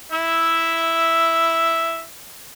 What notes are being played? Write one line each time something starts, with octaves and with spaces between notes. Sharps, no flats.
E4 E5